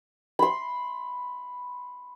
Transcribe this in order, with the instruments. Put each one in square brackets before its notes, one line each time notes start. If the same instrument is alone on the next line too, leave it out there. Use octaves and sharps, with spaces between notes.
[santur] B5 C6